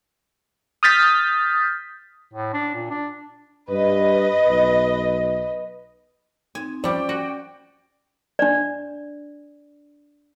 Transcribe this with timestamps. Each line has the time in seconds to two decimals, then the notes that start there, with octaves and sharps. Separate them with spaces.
0.83 D#6 F6 G6 A6 B6
2.34 A2
2.54 D4
2.75 A#2
2.90 D4
3.70 G2 B4 D#5
4.49 B1
6.55 C4 D#4 G#5
6.84 F3 G3 C#4 D5 G5 D6
7.09 F#4
8.39 D4 D5